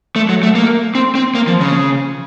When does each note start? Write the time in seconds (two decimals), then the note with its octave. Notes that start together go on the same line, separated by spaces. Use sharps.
0.16 A3
0.29 F#3
0.43 A3
0.55 A#3
0.95 C4
1.15 C4
1.35 A#3
1.47 F3
1.61 C#3